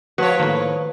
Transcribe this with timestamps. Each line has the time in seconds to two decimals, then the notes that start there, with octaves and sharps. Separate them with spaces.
0.18 F3 F#4 B4 C#5
0.40 A2 D#3 A#3